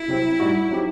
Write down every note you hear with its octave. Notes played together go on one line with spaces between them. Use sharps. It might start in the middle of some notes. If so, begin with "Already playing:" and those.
Already playing: E4
C3 F#3 C4
A2 G3 D#4 F#4
F#3 C4 D#4 G4